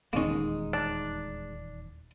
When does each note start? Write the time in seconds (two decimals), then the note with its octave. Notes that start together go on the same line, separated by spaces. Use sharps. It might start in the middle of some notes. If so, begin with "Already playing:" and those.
0.13 D#1 E2 D#3 G#3 A#3 C#4 D#4
0.73 D4